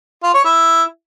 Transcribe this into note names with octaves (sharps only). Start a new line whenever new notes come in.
F4
C#5
E4